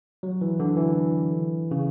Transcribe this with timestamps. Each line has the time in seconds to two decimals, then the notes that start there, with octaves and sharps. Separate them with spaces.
0.23 F#3
0.41 E3
0.60 D3
0.77 E3
1.71 C#3